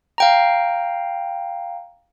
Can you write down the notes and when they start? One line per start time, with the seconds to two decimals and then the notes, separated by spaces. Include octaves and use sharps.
0.18 F5 G5 A#5